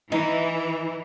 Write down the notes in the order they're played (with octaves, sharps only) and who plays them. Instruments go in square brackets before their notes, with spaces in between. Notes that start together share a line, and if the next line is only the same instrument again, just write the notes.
[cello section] E3 [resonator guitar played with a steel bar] D#4